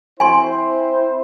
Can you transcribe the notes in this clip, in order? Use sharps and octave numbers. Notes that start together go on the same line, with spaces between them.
C4 E4 C5 G#5 C6